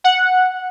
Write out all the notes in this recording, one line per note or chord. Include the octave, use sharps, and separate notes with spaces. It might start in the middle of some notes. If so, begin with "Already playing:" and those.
F#5